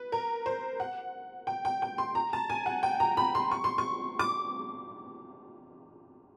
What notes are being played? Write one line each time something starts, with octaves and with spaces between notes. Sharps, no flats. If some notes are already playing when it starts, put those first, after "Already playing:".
Already playing: B4
A#4
C5
F#5
G5
G5
G5
C6
A#5
A5
G#5
F#5
G5
A#5
B5
C6
C#6
C6
C#6
D6